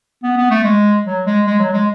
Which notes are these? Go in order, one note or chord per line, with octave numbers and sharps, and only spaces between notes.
B3
B3
A3
G#3
F#3
G#3
G#3
F#3
G#3